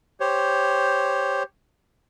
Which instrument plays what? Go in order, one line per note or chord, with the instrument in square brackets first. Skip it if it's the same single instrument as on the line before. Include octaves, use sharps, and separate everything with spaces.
[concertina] G4 C5 C#5